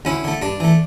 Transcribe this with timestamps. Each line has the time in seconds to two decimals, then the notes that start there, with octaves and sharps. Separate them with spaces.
0.05 D2 C#4 E4
0.24 D3 A3
0.42 G2 D4
0.60 E3 A3